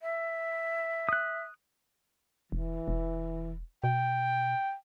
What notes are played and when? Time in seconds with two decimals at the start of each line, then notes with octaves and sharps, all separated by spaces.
0.01 E5
1.09 D#6 F#6
2.52 E1 E3
2.88 E1
3.84 B2 G5